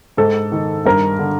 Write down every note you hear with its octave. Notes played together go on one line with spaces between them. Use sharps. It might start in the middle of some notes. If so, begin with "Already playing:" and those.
G#2 A4
D#3
G2 A#4
D3